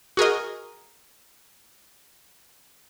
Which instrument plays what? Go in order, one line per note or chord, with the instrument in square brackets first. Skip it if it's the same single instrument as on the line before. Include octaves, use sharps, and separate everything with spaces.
[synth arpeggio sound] F#4 G#4 A#4 D#5